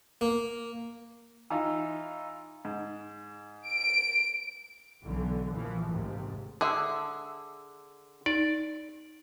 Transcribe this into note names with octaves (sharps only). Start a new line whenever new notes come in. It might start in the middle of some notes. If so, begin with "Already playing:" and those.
A#3
E3 D#4 F4
G#2
D7
B1 D3 E3
A#2 E3 F3 A#3
A1 D#2 G#2 C3
D3 G#4 E5
D#4 D5